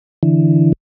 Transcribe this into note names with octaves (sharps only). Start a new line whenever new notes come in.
D3 E3